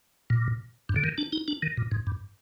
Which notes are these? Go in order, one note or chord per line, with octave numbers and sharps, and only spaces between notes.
A#2
G2
D3
D#3
D4
D#4
D4
D#3
A#2
G#2
G2